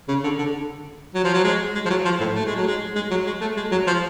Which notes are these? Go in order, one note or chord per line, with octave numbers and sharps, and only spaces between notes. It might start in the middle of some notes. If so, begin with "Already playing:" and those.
C#3
D3
D3
F#3
F3
F#3
G#3
G#3
F3
F#3
F3
A2
A3
G#3
F#3
G#3
G#3
F#3
G#3
A3
G#3
F#3
F3